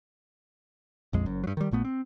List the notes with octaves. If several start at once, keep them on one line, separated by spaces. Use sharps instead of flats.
A#1 F2 G#3
F#1 F#2
G2 F#3
D#3 G3
A#1 A#2 A3 B3
C4